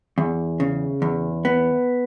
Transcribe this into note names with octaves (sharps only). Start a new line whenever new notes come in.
E2
C#3
E2
B3